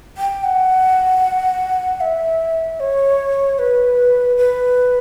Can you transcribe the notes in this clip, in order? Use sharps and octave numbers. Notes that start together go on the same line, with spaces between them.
G5
F#5
E5
C#5
B4
B4